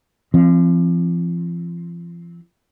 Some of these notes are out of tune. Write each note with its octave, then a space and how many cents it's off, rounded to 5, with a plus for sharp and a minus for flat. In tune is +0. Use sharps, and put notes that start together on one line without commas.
F3 -35 C4 +0